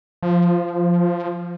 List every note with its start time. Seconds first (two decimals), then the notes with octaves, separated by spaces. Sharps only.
0.23 F3